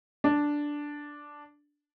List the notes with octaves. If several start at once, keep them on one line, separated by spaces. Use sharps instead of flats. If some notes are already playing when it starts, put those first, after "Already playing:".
D4